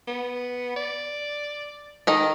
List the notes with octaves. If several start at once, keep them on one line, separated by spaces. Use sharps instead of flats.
B3
D5
D#3 A4 D#5